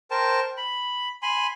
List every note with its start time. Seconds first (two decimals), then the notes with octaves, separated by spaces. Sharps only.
0.11 A#4 C5 G5 A5
0.57 B5
1.22 G#5 B5 C6